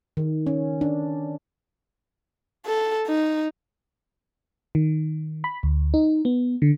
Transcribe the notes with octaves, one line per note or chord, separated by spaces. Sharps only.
D#3
C#4
D4
A4
D#4
D#3
B5
D2
D#4
B3
D3